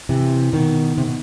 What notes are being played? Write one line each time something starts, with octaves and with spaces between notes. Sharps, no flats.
C3 E3
B2 D#3
C3
B2